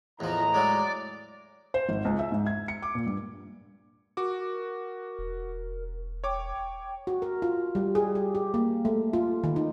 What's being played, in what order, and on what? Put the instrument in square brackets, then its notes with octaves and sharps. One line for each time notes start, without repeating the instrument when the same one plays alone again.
[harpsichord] E2 F3 [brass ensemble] A2 D#5 A#5 [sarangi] E3
[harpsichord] F#3 G#3 [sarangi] D5
[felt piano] C5
G#1
C#2
E5
G#2
G#6
C#7
D6
A#2
G2
[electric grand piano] F#4 D6 [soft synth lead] A#4
[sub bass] E1
[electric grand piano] C#5 D6 [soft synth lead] G5
[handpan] F#4
A#4
F4
G3
G#4
G4
G4
A#3
A3
F4
D#3
D#4